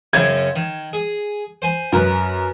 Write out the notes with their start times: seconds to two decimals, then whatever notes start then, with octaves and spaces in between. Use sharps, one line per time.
0.13 F#2 C#3 C4 G#6
0.56 D#3
0.93 G#4
1.62 C5 G#5 B5
1.92 F#2 A#4 B4